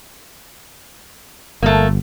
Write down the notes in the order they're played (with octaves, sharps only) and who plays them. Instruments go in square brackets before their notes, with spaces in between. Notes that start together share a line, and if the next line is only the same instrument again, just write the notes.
[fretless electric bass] G1 [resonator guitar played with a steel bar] A3 A#3